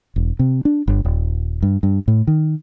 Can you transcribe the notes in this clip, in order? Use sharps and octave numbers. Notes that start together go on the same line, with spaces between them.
E1
C3
D4
G1
D#1
G2
G2
A2
D#3